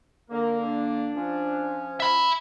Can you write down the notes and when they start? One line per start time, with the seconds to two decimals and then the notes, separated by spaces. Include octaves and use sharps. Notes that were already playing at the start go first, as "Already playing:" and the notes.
0.30 D3 A#3 A#4
0.62 D4
1.16 F3 C#4
2.00 E5 B5